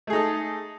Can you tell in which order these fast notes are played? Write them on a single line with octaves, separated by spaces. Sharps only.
A3 G#4 D#4 A4